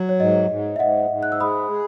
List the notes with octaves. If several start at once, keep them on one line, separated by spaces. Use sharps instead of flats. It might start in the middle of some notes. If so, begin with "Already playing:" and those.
Already playing: F#3
C#5
G#2 D#5
G#2
E5
G#2 D#5 F#5
G#2
F#6
E6
G#3 B5 D#6
G#4